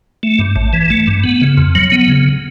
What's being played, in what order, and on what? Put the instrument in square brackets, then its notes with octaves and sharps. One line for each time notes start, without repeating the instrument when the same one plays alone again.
[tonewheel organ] A3
G2
A1
E3
A3
G2
B3
C#3
F2
F#3
B3
C#3